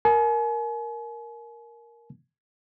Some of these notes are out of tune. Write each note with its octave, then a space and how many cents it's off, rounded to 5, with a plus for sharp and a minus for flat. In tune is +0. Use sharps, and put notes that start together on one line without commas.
A#4 +0 G#5 +40